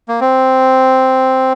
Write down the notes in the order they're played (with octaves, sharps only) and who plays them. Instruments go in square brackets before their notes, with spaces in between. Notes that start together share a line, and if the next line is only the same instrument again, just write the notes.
[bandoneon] A#3
C4